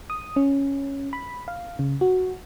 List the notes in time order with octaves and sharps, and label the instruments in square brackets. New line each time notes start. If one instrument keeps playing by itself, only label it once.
[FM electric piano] D#6
C#4
B5
F5
C#3
F#4